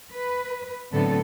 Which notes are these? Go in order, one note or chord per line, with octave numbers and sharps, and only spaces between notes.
B4
A2 D3 F#3 B3 C4 A4